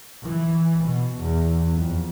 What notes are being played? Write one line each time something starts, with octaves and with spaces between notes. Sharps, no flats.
E3
B2
E2
F2